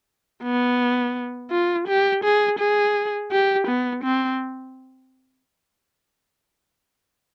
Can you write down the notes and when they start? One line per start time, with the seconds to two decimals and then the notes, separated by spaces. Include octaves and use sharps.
0.43 B3
1.51 F4
1.88 G4
2.24 G#4
2.59 G#4
3.31 G4
3.68 B3
4.04 C4